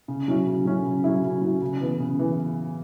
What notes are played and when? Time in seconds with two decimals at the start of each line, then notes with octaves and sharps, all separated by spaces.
0.08 C#3
0.28 F#3 C#4 E4
0.47 C#3
0.65 F#3 C#4 E4
0.85 C#3
1.04 F#3 C#4 E4
1.23 C#3
1.42 F#3 C#4 E4
1.62 C#3
1.81 E3 B3
2.00 C#3
2.19 E3 B3